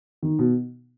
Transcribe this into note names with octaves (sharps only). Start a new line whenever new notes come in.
D#3
B2